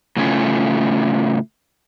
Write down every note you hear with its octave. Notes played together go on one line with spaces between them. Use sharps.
A2 C#3 A3 C#4 F4